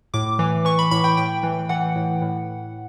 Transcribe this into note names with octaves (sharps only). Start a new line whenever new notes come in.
A2 D6
E3
E3 C#6
B5
A2 B5
G5
A2 G5
E3
E3 F#5
A2
A2